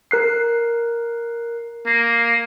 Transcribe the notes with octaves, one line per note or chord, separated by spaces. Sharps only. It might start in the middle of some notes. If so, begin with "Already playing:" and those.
A#4 F#6 C7
A#3